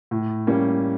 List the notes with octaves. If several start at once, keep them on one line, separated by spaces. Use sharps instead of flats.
A2
G3 A#3 C#4